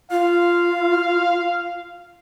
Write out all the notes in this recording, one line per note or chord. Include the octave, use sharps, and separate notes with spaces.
F4 F5